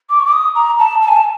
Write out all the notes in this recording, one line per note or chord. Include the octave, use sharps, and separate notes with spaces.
D6
C#6
D6
D#6
A#5
A5
A5
G#5
A5